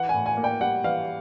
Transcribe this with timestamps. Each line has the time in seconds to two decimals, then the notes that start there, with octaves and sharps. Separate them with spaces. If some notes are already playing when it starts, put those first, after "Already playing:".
Already playing: E3 F#5
0.09 A2 G#5
0.26 G#5
0.37 A#3
0.44 G5
0.61 G3 F#5
0.84 E3 F5